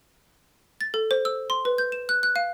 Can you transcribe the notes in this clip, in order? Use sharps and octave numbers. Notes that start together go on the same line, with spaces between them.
A6
A4
C5
E6
C6
B4
G6
E7
F#6
F#6
F5